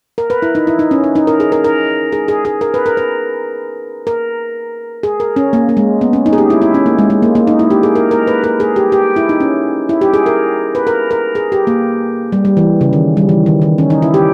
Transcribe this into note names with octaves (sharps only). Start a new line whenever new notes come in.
A#4
B4
E4
D#4
E4
D#4
C#4
D#4
D#4
A#4
G#4
A#4
A#4
G#4
G#4
G#4
A#4
B4
A#4
B4
A#4
G#4
A#4
C#4
A#3
A#3
G#3
B3
C#4
D#4
G#4
G4
E4
E4
C#4
A#3
G#3
G#3
A#3
A#3
D#4
E4
G4
G#4
A#4
A#4
B4
A#4
G#4
G4
G4
E4
D#4
C#4
E4
G4
G#4
A#4
B4
A#4
A#4
G#4
G4
A#3
G3
G3
E3
C#3
D#3
G3
E3
D#3
D#3
C#4
D#4
E4
G4